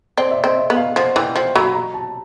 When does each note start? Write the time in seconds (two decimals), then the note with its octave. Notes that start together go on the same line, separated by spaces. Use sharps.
0.17 C4 D5
0.31 E5
0.37 D#5
0.44 C4
0.57 E5
0.70 B3
0.77 F5
0.96 F3 F#5
1.16 E3 G5
1.35 F3 G5
1.56 F#3 B5
1.75 A#5
1.94 A5